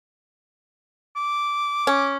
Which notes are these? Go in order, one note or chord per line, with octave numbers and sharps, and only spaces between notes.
D6
C#4